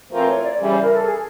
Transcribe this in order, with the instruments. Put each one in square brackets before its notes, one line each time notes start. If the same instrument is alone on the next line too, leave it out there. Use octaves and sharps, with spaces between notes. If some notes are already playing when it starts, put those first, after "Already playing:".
[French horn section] E3 A3 C4 F4 A#4 [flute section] C5
[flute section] C#5
D5
[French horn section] C#3 E3 G3 [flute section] D5
[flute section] C5
A#4
A4
G#4